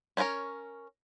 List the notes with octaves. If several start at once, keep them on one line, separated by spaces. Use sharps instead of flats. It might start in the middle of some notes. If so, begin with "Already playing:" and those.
C#4 D#4 F4 A#4 C#5